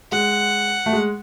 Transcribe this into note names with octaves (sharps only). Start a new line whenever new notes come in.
G#3 F#5
A3
G#3